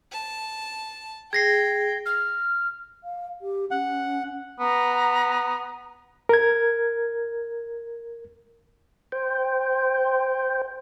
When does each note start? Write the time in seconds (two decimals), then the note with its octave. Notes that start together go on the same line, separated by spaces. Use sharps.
0.12 A5
1.33 G#4 G5 G#6 A#6 C7
2.05 F6
3.04 F5
3.41 G4
3.71 C#4 F#5
4.60 B3 A#5
6.29 A#4 G#6
9.12 C5 G5